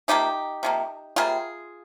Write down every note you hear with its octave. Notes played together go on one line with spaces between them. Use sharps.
C3 F3 A#3 D#4 G4
C3 F3 A#3
C3 G3 A#3 F4 G#4